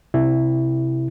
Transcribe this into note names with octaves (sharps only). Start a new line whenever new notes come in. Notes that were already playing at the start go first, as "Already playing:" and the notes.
C3 E4